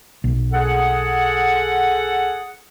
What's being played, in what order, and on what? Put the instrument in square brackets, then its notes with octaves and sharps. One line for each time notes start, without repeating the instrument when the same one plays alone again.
[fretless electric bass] B1
[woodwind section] G#4 A4 F#5